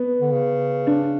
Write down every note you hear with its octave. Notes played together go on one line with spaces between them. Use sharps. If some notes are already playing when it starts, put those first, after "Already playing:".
Already playing: B3
D3
C#3
D4